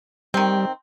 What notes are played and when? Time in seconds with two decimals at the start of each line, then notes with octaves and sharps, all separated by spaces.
0.34 D#3 G3 C4